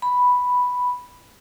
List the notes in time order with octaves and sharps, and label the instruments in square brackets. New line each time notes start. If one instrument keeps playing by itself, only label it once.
[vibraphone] B5